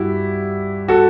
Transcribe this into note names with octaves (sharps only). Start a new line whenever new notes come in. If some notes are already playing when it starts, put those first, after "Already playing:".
Already playing: G2 E4 F#4 G4
F#4 A4